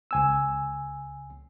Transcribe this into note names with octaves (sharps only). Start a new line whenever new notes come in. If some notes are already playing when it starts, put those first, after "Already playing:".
C#2 G#5 E6